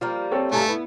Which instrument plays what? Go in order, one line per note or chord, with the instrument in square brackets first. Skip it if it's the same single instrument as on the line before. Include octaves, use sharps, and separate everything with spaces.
[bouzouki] F3 G3 A#3 [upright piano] F4
[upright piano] C4 A4 C#5
[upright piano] G2 G#5 [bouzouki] C3 F#3 A#3 [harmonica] A3
[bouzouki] B3 [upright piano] E4